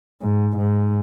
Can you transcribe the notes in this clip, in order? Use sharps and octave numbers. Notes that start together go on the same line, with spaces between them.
G#2
G#2